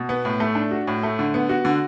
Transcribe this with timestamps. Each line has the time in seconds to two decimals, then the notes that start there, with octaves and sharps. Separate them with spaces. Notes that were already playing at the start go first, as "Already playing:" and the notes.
Already playing: B2
0.09 B3
0.25 A2
0.40 A3
0.55 D4
0.71 F#4
0.87 A2
1.03 A3
1.19 D3
1.34 B3
1.49 F#4
1.65 D3